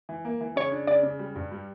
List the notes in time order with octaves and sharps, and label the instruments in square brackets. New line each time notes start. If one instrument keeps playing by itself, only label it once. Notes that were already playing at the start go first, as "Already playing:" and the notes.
[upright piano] E3
A#3
E3
[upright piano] C#3 [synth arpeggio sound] C#5
[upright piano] D4
[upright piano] C#3 [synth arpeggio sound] D5
[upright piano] C#3
G3
G2
G3